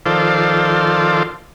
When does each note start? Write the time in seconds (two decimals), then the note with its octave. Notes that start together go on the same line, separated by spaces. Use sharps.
0.06 D#3 F3 F4 A4 C5 D5